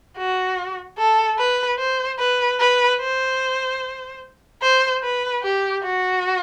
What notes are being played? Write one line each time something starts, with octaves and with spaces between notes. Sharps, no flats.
F#4
A4
B4
C5
B4
B4
C5
C5
B4
G4
F#4